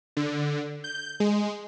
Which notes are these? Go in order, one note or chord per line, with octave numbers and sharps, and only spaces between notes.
D3
G6
G#3